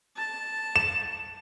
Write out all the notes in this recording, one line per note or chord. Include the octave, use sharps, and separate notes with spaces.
A5
E7